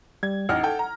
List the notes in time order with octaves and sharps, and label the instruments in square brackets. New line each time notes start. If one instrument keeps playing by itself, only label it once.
[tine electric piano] G3 [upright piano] G#6
[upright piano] A1 D#4 F6 [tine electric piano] F#5
[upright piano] A4 G5
A#5